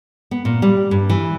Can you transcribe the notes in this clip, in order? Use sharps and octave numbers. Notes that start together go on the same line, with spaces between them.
B3
A#2
G3
G2
E3